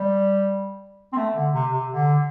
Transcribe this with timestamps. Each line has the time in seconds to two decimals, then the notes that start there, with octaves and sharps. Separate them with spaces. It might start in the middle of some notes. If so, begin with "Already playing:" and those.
Already playing: G3
1.13 C4
1.17 A3
1.35 D3
1.53 C3
1.71 C3
1.89 D3